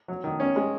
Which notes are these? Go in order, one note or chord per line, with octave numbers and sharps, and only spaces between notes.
F#3
D#3
C#4
G#3